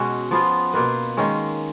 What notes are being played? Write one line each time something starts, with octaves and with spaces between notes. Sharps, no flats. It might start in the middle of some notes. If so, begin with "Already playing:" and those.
Already playing: B2 G#3 C#4 F#4
F3 B3 F4
B2 A#3 F4 B4
D#3 G#3 C#4